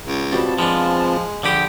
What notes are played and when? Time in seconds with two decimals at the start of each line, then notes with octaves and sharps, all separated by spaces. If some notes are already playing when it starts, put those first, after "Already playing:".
0.05 C#2
0.32 B2 G3 C4 F4 A5
0.59 F3 G#3 B3 D4
1.43 A#1 D3 G4 B5 D6 D#6